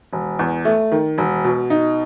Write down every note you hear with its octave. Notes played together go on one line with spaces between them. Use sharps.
E1
E2
A3
D#3
E1
B2
D#4